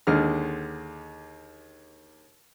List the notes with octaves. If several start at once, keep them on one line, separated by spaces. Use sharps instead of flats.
D#2 D3 G#3 F6